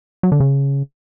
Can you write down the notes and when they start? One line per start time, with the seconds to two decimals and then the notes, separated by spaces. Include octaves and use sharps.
0.23 F#3
0.32 D3
0.40 C#3